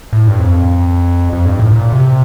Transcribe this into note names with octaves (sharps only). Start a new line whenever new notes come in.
A2
G2
F2
F2
G2
A2
A#2
C3